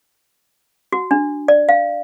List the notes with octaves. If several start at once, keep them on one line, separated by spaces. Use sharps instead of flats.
F#4
D4
D5
F5